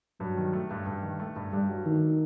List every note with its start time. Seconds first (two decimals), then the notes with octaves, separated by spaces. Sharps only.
0.20 G2 F#3
0.37 D#3
0.53 A3
0.71 G2
0.86 G2
1.03 D#3
1.20 A3
1.36 G2
1.53 G2 G3
1.69 F#3
1.86 D#3 A3